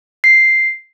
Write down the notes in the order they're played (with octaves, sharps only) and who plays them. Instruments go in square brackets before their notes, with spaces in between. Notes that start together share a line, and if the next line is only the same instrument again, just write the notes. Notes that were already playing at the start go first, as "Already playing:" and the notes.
[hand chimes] C7